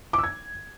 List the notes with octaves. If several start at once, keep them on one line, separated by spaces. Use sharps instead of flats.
D6
E6
G#6